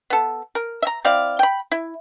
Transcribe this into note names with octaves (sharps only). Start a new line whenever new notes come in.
B3 A4
A#4
E5 A#5
C4 E4 D5 F5
G5 B5
E4